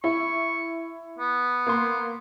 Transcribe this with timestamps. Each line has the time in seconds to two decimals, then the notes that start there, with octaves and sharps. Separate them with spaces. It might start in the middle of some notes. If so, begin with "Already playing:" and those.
0.04 E4 C#6
1.19 B3
1.67 A#3 C6